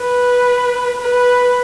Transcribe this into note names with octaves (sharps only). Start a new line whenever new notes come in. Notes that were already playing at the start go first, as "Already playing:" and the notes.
Already playing: B4
B4